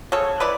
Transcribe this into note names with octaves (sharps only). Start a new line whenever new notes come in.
C#3 A4 C#5
E3 B4 D5